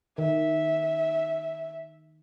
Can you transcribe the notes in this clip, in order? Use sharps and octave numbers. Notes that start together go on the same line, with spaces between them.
D#3 E5